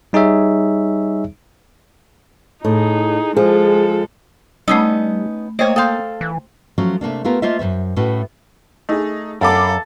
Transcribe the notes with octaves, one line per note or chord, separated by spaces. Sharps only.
G3 D#4 G#4 C#5 E5
A2 D#4 G#4
F3 G#3 G#4 A4
G3 A3 B3 C#4 D#4 E6
A3 A#3 C5 C#5 D#5
A4 F5 G5 C6 D#6 G6
E3
F3 F#3 A3 C#4
C3 A3 A#3 D4
A3 B3 F4 G4 A#4
A3 A#3 F4 C5 D#5 E5
F#2 G#3 C5 E5
A2 A3 C#4 F#4 B4
A3 D#4 G#4
F#2 A4 F5 B5 D6